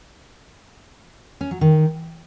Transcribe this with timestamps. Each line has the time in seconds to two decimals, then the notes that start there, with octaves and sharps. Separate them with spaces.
1.41 C#4
1.51 F#3
1.61 D#3